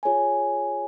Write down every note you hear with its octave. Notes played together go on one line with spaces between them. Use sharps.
F4 G#4 C#5 G#5